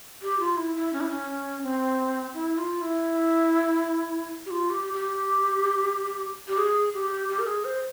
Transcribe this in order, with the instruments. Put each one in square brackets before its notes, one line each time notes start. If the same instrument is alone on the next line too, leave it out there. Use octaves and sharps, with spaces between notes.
[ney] G4
F4
E4
E4
C#4
E4
C#4
C4
E4
F4
E4
G4
F4
G4
G4
G4
G#4
G4
G4
A#4
G#4
C5